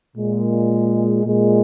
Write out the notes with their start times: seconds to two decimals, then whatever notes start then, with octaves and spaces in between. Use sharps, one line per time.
0.16 A#2 G#3
1.25 A#2 G#3